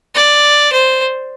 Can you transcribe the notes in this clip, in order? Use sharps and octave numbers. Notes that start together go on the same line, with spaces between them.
D5
C5